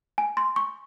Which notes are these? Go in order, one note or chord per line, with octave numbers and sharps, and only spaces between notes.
G#5
C6
C#6